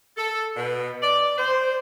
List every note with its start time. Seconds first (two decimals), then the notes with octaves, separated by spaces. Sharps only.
0.17 A4
0.57 B2
1.02 D5
1.38 C5